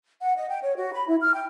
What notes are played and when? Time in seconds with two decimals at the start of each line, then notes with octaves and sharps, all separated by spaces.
0.22 F#5
0.37 D#5
0.48 G5
0.62 C#5
0.77 F#4
0.94 B5
1.07 E4
1.20 F6
1.34 G5